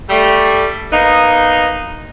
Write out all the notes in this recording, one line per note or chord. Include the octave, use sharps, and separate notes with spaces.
G3 A3
A#3 B3 D#4